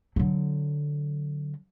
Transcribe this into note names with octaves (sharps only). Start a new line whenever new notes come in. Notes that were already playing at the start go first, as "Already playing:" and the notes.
D3 F#3